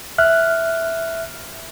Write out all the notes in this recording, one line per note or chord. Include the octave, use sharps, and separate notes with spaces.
E5 F6 F#6